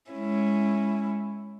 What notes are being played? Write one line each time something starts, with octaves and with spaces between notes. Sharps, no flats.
G#3 C#4 E4